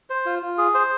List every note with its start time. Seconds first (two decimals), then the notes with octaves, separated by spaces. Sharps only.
0.10 C5
0.26 F4
0.42 F4
0.58 G#4
0.74 C5